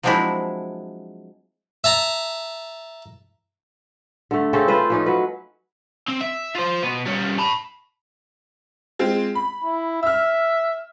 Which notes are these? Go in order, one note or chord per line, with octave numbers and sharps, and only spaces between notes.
F3 F#3 G#3 C4 D4 E4
E5 A5 A#5
D3 A3
C#3 C4 C#4 A4
F4 B4 C5
F3 C#4 D#4
F#3 B4
C4
E5
F4 C5
B2 B4
G3 C#4
A5 B5
G#3 C4 F4
B5
E4
E5 E6 F6